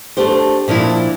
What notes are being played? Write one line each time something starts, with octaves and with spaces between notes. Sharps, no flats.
A3 D4 G4 C5
A#2 F3 D4 E4